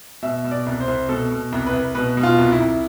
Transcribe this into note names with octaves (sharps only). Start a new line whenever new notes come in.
B2 E5
B2
D5
C2
C5
C2
B2 A4
B2
C2
B4
C2
B2 B4
B2
F4
C2
E4
C2